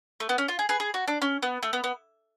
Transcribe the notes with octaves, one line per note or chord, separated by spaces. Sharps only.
A3
B3
C#4
F4
G#4
G#4 B4
G#4
F#4
D4
C#4
B3
A3
B3
B3